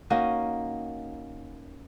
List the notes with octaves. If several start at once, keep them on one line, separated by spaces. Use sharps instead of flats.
A#3 C#4 D#4 F#4